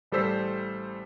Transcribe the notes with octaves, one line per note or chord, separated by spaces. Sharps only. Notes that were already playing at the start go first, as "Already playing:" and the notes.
A1 G3 A4 C5 E6 B6